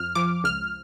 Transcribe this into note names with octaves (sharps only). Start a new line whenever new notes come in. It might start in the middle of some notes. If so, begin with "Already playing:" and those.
Already playing: F2 F6
F3 D6
C#2 F6